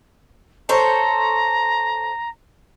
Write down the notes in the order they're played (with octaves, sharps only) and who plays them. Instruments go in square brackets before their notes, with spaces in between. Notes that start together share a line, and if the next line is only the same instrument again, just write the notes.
[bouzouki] A4 C5 C#5 [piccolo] A#5